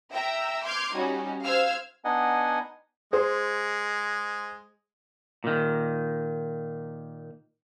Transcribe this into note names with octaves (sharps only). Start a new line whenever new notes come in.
E5 G5 A#5 E6
C6 D6 F6 G6 G#6
G3 C#4 D#4 F#4
C5 F5 E6 F6 G#6
B3 D4 D#4 D#5 F#5 G#5
G#3 G#4 C5
A#2 D#3